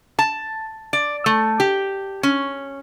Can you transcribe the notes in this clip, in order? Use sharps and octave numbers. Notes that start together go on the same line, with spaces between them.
A5
D5
A3
G4
C#4